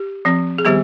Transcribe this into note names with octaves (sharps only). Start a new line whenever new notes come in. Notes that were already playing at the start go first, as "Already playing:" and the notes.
Already playing: G4
F3 C4
G#4
D#3 G3 B3 G4